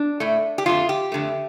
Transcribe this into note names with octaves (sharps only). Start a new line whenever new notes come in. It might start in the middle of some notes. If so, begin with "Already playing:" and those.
Already playing: D4
A2 A3
G4
F2 D3 A3 F4
G4
F2 D3 A3